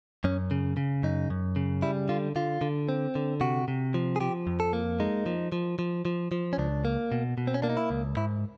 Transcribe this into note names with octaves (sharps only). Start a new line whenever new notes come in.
F#2 C#4
C#3
C#3
F#2 D#4
F#2
C#3
G3 E4
D3 F4
D3 F4
D3
C4
D3
C3 F#4
C3
F3
G#4
F3 G4
F2
A4
A#3
G#3 D#4
F3
F3
F3
F3
F3
C#4
C#2 D4
A#3
B2
B2
C4
C#4
A#3 D4
D#4
E4
C#2
G#2 E4